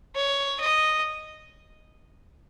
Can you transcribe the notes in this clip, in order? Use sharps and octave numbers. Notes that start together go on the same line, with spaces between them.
C#5
D#5